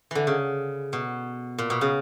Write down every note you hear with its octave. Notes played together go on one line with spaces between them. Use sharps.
D3 E3
C#3
B2
A#2
B2
C#3